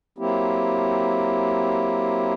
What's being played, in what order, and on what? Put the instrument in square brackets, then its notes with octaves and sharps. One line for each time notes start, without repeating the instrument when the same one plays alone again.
[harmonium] F#3 A#3 C4 E4 G4